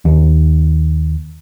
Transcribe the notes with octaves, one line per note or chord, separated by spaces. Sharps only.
D#2